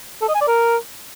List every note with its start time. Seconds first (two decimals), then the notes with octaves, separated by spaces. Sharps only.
0.22 A4
0.28 D#5
0.35 G#5
0.41 D5
0.47 A#4